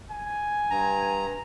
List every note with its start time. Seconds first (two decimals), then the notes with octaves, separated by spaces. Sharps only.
0.11 G#5
0.71 G2 A#5